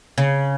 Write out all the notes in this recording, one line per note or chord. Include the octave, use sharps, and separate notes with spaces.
C#3